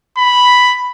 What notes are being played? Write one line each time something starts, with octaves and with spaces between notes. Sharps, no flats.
B5